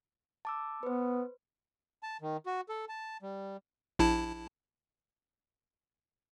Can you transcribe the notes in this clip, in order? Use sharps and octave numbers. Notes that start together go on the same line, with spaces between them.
A5 D6 E6
B3 B4 C5
A5
D#3
F#4
A4
A5
G3
A#1 E4 A5